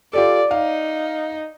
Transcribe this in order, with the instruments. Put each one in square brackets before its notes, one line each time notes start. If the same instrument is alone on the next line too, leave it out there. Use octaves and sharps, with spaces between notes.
[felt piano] F4 G4 A4 [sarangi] D5
[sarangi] D#4 [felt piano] F5